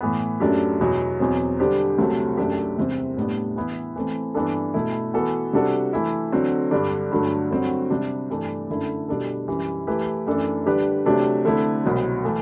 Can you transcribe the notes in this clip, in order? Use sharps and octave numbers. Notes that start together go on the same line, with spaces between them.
A2 E3 B3
F#2 F#3 A3 D4 G4
E2 B2 F#3
E2 B2 F#3 C4
D3 G3 D4 G4 C5
C2 C3 F#3 A3
F#2 F#3 A3 D4 G4
E2 C3 G3 C4
A2 G3 B3 D4
E3 B3 E4 B4
E3 A3 C4
G2 E3 B3 D4 A4
B2 A3 E4
E3 B3 F#4 A4
C3 G3 D4 F#4 A4
E3 A3 E4
D3 F#3 C4
G2 D3 G3 D4
G2 D3 F#3 A3
G2 D3 F#3 C4 F#4
C3 G3 D4
G2 E3 A3 D4
F#2 D3 A3 E4
B2 G3 D4 A4
F#2 E3 G3
E3 A3 E4 G4 B4
F#2 E3 A3 D4 A4
D3 G3 D4 G4 B4
C3 F#3 A3 D4 G4
D3 A3 C4 E4
C2 B2 F#3
E3 A3